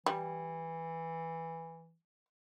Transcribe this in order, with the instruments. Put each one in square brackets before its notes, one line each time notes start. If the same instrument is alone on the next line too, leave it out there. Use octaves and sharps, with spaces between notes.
[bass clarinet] E3 [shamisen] G3